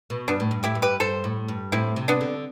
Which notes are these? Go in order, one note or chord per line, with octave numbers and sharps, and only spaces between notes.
B2
G2 B3 D4
A2
G2
A2 E4 G4
G2
G4 B4
G2 A4 C5
A2
G2
A2 C4 E4
C3
B3 D4
D3